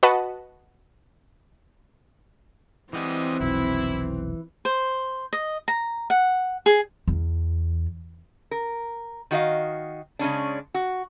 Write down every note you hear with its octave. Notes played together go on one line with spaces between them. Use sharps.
F#4 B4 D#5 F#5 A5 B5
E3 G3 G#3 C4 D#5 F#5
F1 B1 E4
C5
D#5
A#5
F#5
G#4
E2
A#4
D#3 F#4 D#5 F5
C#3 G#3 C#4 D4
F#4